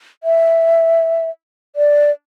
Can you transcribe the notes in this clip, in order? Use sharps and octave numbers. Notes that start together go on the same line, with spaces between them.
E5
D5